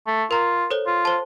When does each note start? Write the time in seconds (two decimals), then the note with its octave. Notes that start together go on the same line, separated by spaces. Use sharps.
0.07 A3
0.31 F4 A#4 A#5
0.70 A4 C5 C#5
0.87 F4
1.05 C5 A5